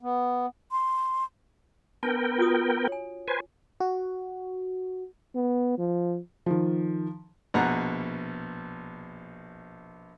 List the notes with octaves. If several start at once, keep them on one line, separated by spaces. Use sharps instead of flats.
B3
C6
B3 D4 A#4 G5 A5
F4 F#4 D#6
C#5 G#5
B4 C5 G#5
F#4
B3
F3
D#3 F3
A#1 B2 F#5 A#5